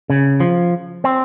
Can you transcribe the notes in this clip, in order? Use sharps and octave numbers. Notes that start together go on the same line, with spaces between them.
C#3
F3
C4